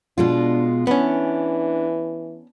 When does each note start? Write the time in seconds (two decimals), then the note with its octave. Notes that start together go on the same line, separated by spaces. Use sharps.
0.18 B2 G#3 D4 F4
0.87 E3 B3 C#4 D4